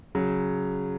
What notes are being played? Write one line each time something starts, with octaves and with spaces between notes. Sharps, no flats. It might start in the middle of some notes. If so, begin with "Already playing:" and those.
C#3 F#3